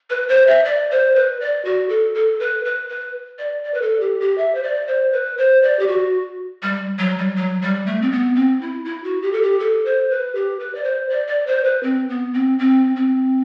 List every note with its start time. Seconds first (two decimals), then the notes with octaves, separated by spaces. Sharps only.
0.10 B4
0.29 C5
0.47 E5
0.65 D5
0.91 C5
1.15 B4
1.40 D5
1.65 F#4
1.89 A4
2.15 A4
2.40 B4
2.65 B4
2.89 B4
3.39 D5
3.64 D5
3.74 B4
3.82 A4
4.01 G4
4.20 G4
4.38 E5
4.55 C5
4.63 D5
4.87 C5
5.13 B4
5.38 C5
5.62 D5
5.79 G4
5.88 F#4
6.63 G3
6.99 F#3
7.18 G3
7.36 F#3
7.62 G3
7.87 A3
8.02 C4
8.12 B3
8.35 C4
8.61 E4
8.85 E4
9.04 F#4
9.22 G4
9.33 A4
9.42 G4
9.60 A4
9.86 C5
10.10 B4
10.35 G4
10.59 B4
10.75 D5
10.84 C5
11.10 D5
11.27 D5
11.47 C5
11.65 B4
11.83 C4
12.09 B3
12.34 C4
12.59 C4
12.96 C4